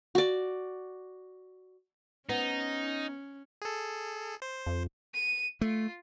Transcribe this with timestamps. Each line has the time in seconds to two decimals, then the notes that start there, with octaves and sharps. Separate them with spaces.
0.15 F#4 D5
2.29 B3 C#4 D#4
3.62 G#4 A4
4.42 C5
4.66 F2
5.14 D#7
5.61 A3 F4